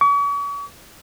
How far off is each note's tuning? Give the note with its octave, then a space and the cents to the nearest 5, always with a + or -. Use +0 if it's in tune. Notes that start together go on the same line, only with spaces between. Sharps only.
C#6 +45